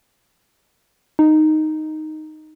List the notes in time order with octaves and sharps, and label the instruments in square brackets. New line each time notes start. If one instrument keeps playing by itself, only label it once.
[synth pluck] D#4